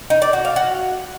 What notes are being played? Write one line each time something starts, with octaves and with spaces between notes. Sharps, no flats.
D#4
D5
F#4
F5
F#4